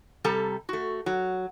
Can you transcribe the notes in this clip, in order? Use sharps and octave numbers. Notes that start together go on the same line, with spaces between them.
C3 G3 A4 A5 A#5
A3 F#4
F#3